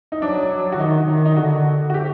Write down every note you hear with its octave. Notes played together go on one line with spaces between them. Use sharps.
D#4
F#3 D4
F#4
D#3 D#4
D#3 D#4
D#4
D3 F#4
F#4
G4